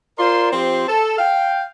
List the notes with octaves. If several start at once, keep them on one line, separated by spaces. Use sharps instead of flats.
F4 A#4 C5 D5 C6
F3 C4 G4 C6
A4
F5 G5